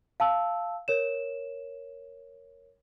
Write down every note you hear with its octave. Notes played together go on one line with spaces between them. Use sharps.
F5 A5 E6
A#4 C#5 E7